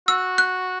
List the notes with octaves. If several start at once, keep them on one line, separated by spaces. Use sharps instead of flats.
F#4 E6
F#6